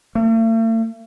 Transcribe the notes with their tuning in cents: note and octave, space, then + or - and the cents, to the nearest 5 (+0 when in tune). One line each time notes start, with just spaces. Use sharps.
A3 +45